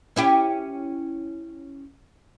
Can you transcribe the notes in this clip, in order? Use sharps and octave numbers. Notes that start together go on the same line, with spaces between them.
C#4 E4 G4